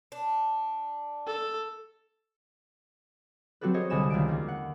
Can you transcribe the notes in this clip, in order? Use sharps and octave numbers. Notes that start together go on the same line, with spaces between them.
D4
A4
F#3 C4 F#4 G4 A4 B4
G#4 A4 C5 C#5 D#5
C2 D3 D#5 G#5 B5 E7
C#2 D#3 D7
D#2
F#5